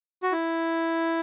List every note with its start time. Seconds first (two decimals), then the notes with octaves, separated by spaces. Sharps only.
0.23 F#4
0.32 E4